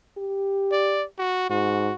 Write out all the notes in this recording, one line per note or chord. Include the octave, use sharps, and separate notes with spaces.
G4
D5
F#4
G#2 F#4